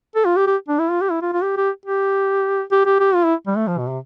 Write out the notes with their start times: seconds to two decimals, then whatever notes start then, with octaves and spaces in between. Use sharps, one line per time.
0.15 A4
0.25 F4
0.36 G4
0.47 G4
0.68 D4
0.79 E4
0.90 F4
1.01 G4
1.11 E4
1.22 F4
1.33 F4
1.43 G4
1.57 G4
1.85 G4
2.71 G4
2.86 G4
2.99 G4
3.14 F4
3.25 E4
3.47 G3
3.56 A3
3.67 F3
3.78 B2
3.89 C3